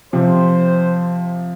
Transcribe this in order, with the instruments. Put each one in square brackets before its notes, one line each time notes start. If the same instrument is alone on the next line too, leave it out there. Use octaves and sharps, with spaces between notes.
[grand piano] C3 [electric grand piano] F3 [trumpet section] C5